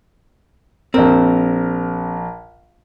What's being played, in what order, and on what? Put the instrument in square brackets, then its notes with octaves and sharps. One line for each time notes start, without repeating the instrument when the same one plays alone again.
[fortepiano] A#1 A#4 [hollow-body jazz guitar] C4